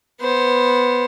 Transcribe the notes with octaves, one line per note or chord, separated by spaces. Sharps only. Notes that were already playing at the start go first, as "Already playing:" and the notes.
B3 C5